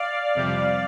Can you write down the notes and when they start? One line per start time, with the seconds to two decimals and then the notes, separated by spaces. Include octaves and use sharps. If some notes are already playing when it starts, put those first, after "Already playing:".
Already playing: D5 F5
0.35 F2 C3 G3